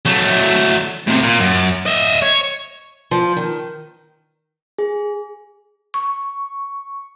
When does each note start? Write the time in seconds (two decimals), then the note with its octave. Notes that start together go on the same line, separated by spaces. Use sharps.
0.05 F#3 A3
1.08 A2 C3
1.23 A#2
1.40 F#2
1.86 D#5 E5
2.23 C#5
3.11 F3
3.36 D#3
4.79 G#4
5.94 C#6